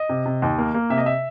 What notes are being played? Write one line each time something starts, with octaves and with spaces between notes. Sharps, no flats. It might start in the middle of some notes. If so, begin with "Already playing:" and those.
Already playing: D#5
C3
C3
D#2
A#3
A#3
C3 E5
D#5
E5